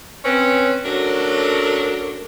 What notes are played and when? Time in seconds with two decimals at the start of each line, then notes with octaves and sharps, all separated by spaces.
0.25 C4 C#4 B4
0.85 F#3 A3 C#4 D4 A4 A#4